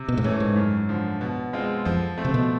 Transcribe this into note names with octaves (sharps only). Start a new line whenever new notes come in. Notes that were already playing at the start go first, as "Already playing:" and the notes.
Already playing: C3
B2
G#2
A2 E3 A3 C#4
G#2
F#2
D3 F3
B2
G#3 C4 F4
F2 F3
A3 C4
C3
B2